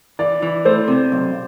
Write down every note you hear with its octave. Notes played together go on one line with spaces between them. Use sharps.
E3 D5
E3
A3 C5
C3
B1